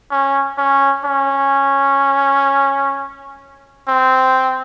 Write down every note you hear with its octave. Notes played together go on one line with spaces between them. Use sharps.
C#4
C#4
C#4
C4